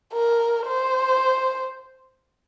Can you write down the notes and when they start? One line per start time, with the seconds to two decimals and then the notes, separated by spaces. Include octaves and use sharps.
0.13 A#4
0.67 C5